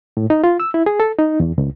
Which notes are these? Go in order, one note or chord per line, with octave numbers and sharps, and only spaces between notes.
A2
D#4
F4
E6
E4
G#4
A4
D#4
E2
C#2